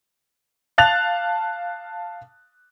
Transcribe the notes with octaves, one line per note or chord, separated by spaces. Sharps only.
F5 A5 F#6 A6 F7